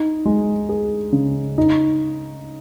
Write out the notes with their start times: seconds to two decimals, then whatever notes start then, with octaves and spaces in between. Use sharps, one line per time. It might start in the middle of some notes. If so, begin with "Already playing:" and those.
Already playing: D#4
0.26 G#3
0.69 G#4
1.13 C#3
1.58 D#4